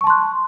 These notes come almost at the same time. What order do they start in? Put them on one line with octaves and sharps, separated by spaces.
C#6 A5 C6 F#6